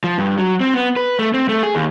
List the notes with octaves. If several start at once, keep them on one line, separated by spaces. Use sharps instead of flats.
F3
G2
F#3
C4
B3
B4
A3
C4
A3
G#4
D#2